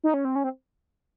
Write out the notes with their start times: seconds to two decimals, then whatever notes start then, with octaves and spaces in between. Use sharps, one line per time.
0.04 D#4
0.14 C#4
0.25 C4
0.36 C#4
0.44 C4